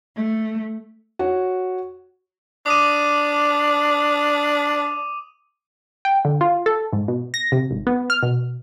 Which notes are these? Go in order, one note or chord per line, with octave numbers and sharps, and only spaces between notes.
A3
F#4 C#5
D4 D6 D#6 D#7
G5
D3
F4
A4
G#2
B2
A#6
C3
G#1
B3
F6
B2